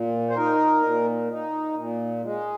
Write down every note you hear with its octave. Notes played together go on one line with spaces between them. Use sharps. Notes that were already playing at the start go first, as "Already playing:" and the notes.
Already playing: A#2
C5
D#4 A#4
A#2
D#4
A#2
G#3